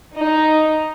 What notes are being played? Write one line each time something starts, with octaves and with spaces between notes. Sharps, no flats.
D#4